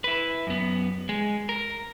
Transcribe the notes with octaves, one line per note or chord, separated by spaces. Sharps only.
E4 B4
F#2 B3
G#3
A#4